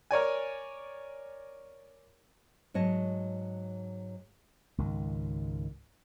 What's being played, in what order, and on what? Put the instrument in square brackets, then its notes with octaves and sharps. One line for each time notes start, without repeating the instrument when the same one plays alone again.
[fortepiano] A#4 C#5 D5 G#5
[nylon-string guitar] G#2 F#3 C#5 D#5 A5
[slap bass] C#2 G#2 D#3